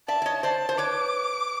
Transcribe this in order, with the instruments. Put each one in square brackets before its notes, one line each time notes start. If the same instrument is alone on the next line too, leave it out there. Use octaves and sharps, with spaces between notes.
[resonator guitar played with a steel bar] D5 E5 [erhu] A5
[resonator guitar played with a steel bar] D5
C#5 D#5
[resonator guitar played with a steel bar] C5 D5 [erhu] A5
[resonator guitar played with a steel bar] C5
[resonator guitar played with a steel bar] B4 C#5 [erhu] D6